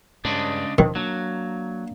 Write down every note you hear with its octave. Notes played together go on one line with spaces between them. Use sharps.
G2 C#3 G#3 D4
D#1 D#3 F3 D4
F#3 A#3 D4